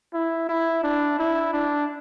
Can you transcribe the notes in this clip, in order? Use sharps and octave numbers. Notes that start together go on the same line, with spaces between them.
E4
E4
D4
E4
D4